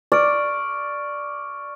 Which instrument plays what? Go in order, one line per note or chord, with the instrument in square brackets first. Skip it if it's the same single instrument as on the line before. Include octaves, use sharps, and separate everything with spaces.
[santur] D5 [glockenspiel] C#6 F6 D7